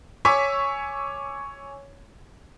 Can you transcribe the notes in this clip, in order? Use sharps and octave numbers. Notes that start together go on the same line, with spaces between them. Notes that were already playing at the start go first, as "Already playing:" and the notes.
C#5 G#5 C#6 D6 E6 B6